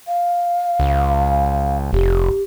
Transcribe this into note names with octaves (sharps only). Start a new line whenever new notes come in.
F5
C#2
F1 G4